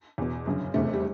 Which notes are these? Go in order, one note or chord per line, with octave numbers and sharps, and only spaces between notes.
E2 B2
G1 F#2 C#3
F1 E2 C3 A3
G3